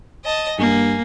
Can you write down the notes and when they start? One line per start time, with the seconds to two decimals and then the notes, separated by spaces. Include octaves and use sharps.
0.25 D#5 A5
0.59 G2 A#3 G#5